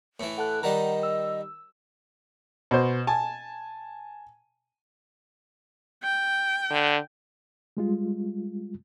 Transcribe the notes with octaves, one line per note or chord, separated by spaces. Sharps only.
A2 E3
A4 F#5 A5 F#6
D#3 G3 D5 D#5 F#5 A#5
E6
B2 C5
G#5 A5
G5
D3
G3 G#3 F4